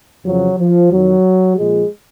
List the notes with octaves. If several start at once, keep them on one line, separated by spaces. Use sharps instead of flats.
F2 C#3 F3 F#3
F3
F2 D#3 F#3
A#2 F3 G#3